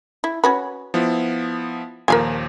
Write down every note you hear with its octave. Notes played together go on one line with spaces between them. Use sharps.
E4
C#4 F#4 B4
F3 B3 E4
D#2 A#2 F3 A#4 F5 G#5